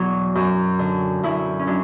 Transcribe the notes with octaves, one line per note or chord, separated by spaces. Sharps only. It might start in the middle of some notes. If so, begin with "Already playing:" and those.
Already playing: E2 B2 F#3 F#4
F#2
D3
F#2 E4
C#4
F#3 D4